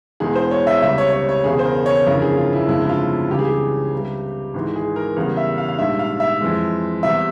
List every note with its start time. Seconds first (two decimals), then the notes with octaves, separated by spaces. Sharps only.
0.20 E1 E2 E3 G#3 G#4
0.36 C5
0.51 C#5
0.67 E5
0.82 C#2 C3 G3 E5
0.98 C#5
1.13 C#5
1.29 C#5
1.44 E1 E2 C#3 G#4
1.59 C5
1.65 A#4
1.86 C#5
2.06 G1 F2 C#3 E3 A#4
2.22 G#4
2.37 F4
2.53 E4
2.68 G1 F2 C#3 F3 G#3 E4
2.83 E4
2.89 F4
3.30 C#2 C#3 E3 G3 G4
3.39 G#4
3.47 G4
3.93 C#2 C3 G3
4.54 G#1 G#2 E3 G#3
4.76 G#4
4.96 A#4
5.16 E2 C#3 G3 A#4
5.37 E5
5.58 F5
5.68 F5
5.78 A#1 G#2 G3 E5
5.99 F5
6.20 E5
6.41 F2 E3 G#3
7.03 E2 C3 G3 E5